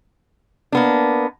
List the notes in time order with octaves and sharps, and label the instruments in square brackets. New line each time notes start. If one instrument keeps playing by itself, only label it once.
[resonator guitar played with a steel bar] A#3 B3 D4